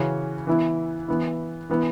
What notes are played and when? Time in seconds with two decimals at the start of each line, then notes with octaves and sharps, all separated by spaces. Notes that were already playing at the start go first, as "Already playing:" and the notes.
Already playing: C#3 E3 C#4 F#4
0.47 E3 B3 E4
1.08 E3 B3 E4
1.70 E3 B3 E4